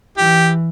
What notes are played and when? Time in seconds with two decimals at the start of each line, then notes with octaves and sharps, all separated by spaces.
0.18 E3 G4